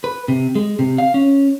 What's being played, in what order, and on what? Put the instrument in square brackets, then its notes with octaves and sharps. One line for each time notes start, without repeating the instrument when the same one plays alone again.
[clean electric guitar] B4
C3
G#3
C3
F5
C#4